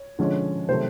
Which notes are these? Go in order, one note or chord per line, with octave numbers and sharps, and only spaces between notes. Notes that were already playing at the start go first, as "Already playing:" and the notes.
Already playing: C#5
D3 F3 G#3 C#4
C3 D#3 F#3 A3 C5